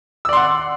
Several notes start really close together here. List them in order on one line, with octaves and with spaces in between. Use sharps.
E6 D5 C6 F#5